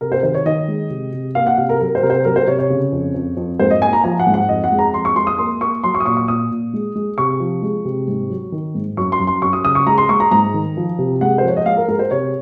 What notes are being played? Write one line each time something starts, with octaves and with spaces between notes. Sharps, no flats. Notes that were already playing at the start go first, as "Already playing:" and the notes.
C3 A#4
C5
D#3 C5
C#5
D#3 D#5
G#3
C3
C3
A#3 F5
F#5
C3 F5
A#4
F#3 A#4
C5
C3 A#4
C5
F#3 A#4
C5
C3 C#5
C#5
C#3
F2
F2
F2
G#2 C5
D#5
A#3 G#5
A#5
F3 G#5
F#5
G#2
F#5
F2 D#5
F#5
G#3
A#5
F2 C6
C#6
G#3 C6
D#6
A#3 C6
A#3 C#6
F#3 C6
C#6
D#6
A#2 C#6
C#6
A#2 D#6
A#2
G#3
G#3
C3 C#6
F3
G#3
C3
G#2
F#3
D#3
G#2
F#2 C#6
C6
F#2
C6
F#2 C#6
D#6
C#3 D#6
C#6
G#3 A#5
C6
G#3 C#6
A#5
G#2 A#5
D#3
F3
C3
G#3 F#5
C5
F3 C#5
D#5
G#3 F5
A#4
G#3 A#4
C5
C3 C#5